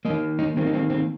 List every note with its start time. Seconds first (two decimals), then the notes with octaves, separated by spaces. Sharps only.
0.05 A#3 D#5
0.10 D#3
0.39 D#4
0.57 D#3 A#3 C4
0.67 D#4
0.74 C4
0.90 C4